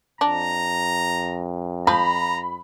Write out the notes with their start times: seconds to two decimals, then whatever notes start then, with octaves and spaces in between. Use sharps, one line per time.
0.21 F2 D4 A#5
1.87 F3 A#5 B5